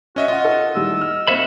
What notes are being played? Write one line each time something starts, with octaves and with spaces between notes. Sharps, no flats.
C#4 F#4 D#5 E5
F4 D#5 F#5
A4
D#3 G3 E4 E6
F6
A#3 C4 F#4 E5 B5